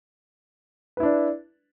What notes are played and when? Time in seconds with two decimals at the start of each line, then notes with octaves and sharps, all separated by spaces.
0.97 B4
1.00 E4
1.03 D4